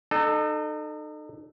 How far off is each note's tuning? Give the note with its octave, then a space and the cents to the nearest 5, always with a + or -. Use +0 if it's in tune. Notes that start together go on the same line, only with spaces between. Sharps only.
D#4 -35 A4 +0